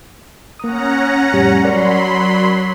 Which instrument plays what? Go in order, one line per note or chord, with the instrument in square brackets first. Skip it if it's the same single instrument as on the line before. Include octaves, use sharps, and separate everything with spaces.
[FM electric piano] A#3 D#6 [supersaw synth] C#4 F#5 A#5
[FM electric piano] F2 A2 G3
[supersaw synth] F#3 B5 C6 [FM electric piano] A#4 C#5 D5